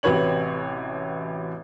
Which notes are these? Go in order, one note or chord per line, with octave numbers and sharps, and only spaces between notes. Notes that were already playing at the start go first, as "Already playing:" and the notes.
A1 C3 F#4 B4 C#5 F#7